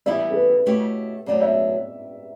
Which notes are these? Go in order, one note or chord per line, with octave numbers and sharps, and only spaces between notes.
E3 G3 B3 E4 G4 E5
A4
B4
B2 A3 E4 G4 C#5
B2 F#3 A3 D5
E5